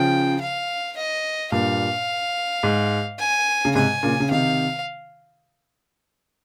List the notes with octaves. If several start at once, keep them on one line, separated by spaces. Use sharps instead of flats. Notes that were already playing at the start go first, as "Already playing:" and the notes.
Already playing: C#3 F3 G5
F5
D#5
G2 A#2 F5
G#2
G#5
C#3
G#2 C3 G#5
A#2 C#3
C#3
C3 D#3 F5